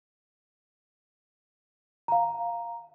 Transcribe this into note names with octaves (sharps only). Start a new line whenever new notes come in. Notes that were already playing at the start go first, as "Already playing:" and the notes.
F5 A#5